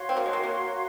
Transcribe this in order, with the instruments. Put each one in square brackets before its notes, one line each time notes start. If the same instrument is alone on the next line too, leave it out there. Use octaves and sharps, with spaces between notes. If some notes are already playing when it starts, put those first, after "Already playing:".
Already playing: [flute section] F#4 C#5 F5 C6
[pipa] C4
A#3
G#3
A#3
A#3